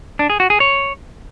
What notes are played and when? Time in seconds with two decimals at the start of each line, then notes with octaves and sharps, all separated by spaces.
0.19 D4
0.30 G#4
0.40 F#4
0.50 G#4
0.60 C#5